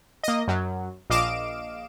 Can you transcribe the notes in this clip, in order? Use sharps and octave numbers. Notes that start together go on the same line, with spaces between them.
A#3 D#5
F#2 F#3
A#1 D#5 F5 D6 D7 E7